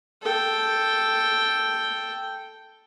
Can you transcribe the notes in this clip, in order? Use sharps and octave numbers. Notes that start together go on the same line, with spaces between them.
A4 G5